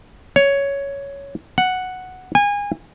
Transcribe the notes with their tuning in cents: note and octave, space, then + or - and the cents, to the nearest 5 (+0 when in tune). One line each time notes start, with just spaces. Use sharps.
C#5 +10
F#5 +0
G#5 -25